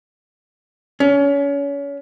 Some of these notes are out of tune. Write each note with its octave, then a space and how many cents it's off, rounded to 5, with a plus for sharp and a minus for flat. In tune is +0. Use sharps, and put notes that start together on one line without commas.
C#4 +30